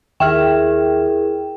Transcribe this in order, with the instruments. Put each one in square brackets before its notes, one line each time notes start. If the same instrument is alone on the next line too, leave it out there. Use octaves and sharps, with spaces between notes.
[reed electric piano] D#2 E5 F6 [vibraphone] E4 G#4 A#4 [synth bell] G5